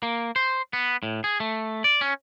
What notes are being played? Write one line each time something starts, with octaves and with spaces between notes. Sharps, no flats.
A#3
C5
B3
A2
G#4
A3
D5
C#4